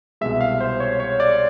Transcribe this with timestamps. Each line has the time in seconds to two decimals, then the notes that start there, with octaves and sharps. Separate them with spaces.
0.21 C2 B2 G#3 E5
0.41 F5
0.61 C5
0.80 C#5
1.00 C#5
1.20 D5